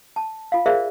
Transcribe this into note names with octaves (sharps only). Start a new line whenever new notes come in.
A5
F4 F5
G#4 A#4 C5 D5 E5 F5